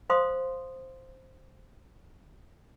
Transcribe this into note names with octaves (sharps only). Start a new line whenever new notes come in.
C5 F5 C6 D#6